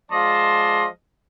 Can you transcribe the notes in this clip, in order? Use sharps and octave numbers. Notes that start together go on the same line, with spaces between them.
F3 G#3 D5 D#5 A5 C6